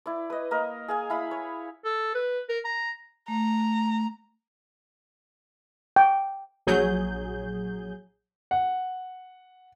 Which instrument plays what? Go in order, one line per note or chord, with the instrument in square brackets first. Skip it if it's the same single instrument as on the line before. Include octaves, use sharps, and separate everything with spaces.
[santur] E4 D5
B4 D#5
A#3 A#4 D#5
G#4 F5 G#5
E4 F5 B5 D#6
C#5
[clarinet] A4
B4
A#4
A#5
[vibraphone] A3 [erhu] A#5
[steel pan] G5
[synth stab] A#1 F#3 G#4 G6
[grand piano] F#5